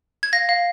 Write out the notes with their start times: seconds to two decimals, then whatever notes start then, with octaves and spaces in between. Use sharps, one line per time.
0.23 G#6
0.33 F5 A#6
0.49 F5